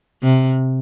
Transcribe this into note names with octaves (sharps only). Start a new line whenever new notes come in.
C3